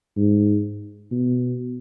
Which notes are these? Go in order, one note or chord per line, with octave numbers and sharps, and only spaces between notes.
G#2
B2